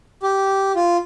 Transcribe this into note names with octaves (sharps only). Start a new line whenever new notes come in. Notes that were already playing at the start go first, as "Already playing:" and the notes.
G4
F4